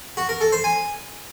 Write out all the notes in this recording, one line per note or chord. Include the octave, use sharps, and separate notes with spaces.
F#4
A#4
A4
C5
G#5